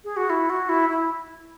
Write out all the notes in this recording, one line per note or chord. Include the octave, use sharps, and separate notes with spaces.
G#4
F#4
E4
F#4
E4
E4